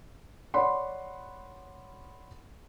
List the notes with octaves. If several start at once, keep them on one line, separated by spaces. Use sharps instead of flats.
C#5 D5 F#5 B5 C6